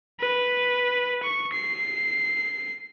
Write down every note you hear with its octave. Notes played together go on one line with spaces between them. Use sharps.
B4
C#6
C7